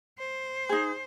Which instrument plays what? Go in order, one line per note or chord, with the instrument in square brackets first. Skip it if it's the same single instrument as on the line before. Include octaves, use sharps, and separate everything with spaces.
[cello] C5
[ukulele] D#4 G#4